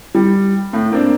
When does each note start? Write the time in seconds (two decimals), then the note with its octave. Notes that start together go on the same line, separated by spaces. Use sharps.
0.15 G3
0.73 A2
0.92 A#3 C4 D4